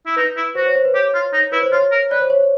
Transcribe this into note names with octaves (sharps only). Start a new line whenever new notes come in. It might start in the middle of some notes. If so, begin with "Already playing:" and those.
E4
D#4 B4
E4
F#4 C5
C#5
C5
B4
G4 C#5
F4
D#4
E4 B4
C5
F4 C#5
A#4
B4 D5
C5
C#5